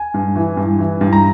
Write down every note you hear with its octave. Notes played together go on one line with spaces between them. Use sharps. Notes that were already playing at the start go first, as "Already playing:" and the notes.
Already playing: G#5
G2
E3
G2
E3
G2
A#5